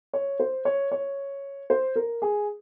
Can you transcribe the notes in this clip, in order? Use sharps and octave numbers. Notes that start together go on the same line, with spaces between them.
C#5
C5
C#5
C#5
C5
A#4
G#4